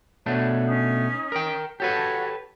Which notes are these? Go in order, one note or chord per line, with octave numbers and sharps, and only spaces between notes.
B2 A3 D4 C#5
C#4 D#4
A#4 G5
F#4 G4 A4 B4 C#5 A5